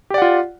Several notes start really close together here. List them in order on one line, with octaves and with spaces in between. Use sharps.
G4 D5 F#5 F4